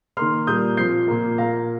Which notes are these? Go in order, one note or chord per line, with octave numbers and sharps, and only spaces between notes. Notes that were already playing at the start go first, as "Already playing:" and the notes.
D#3 A#3 C6 F6
A#2 G3 A#3 D#6 G6
A#2 F3 C4 G6 C7
A#2 A#3
A#2 A#3 F5 A#5